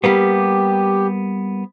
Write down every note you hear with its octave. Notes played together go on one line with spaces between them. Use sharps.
G3 A#3 B3 G4